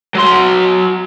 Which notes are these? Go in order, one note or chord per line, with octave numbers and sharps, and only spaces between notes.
F#3 C6